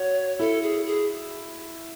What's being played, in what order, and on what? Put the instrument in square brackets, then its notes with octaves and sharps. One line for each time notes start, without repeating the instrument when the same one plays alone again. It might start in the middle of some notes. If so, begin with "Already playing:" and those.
Already playing: [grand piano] F#4 [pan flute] C#5
[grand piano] E4 [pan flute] A4
[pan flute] G#4
G#4